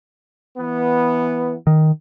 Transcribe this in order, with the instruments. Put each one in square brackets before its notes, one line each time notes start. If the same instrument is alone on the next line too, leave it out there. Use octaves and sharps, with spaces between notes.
[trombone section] E3 B3
[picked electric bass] D#3